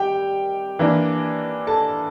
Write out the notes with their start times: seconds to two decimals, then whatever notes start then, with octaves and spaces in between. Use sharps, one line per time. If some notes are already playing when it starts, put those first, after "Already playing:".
Already playing: G3 G4 G5
0.79 E3 A#3 D4
1.67 A4 A5